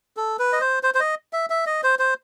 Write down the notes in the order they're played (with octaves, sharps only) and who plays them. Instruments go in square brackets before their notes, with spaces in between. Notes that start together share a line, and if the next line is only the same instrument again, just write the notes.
[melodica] A4
B4
D#5
C5
C5
C5
D#5
E5
E5
D#5
C5
C5